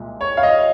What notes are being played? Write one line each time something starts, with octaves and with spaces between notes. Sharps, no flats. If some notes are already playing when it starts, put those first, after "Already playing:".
Already playing: C2 A#2 G#3
C#5
F5
D#5